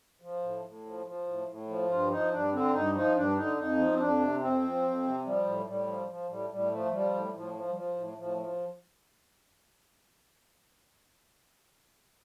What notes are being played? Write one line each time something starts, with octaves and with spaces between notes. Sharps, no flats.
F3
A2
A2
F3
F3
A2
A2
F3
G2 F4
F3 D#4
G2 D4
D3 C4
G2 D#4
F3 D#4
G2 D4
D3 D#4
F2 D#4
F3
C4
F2 D4
C3
F2 C4
F3
F2
C3
F3 G3
A2
A2 G3
F3
F3
A2 G3
A2 G3
F3 A3
F3 G3
A2
A2 F3
F3
G3
F3
A2
A2 F3
F3